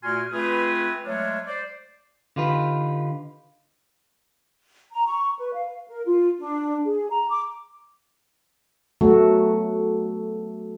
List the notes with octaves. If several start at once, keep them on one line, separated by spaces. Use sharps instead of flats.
A#2 A3 F#4 G#5 C6 F6
A3 C4 F4 G#4 B4
F#3 G#3 A3 D4 F4 C#5
C5 D5
D3 D#4 F4 G4 B4
A#5
C#6
B4
F5
A#4
F4
D4
G#4
A#5
D6
F#3 A3 B3 F#4 A4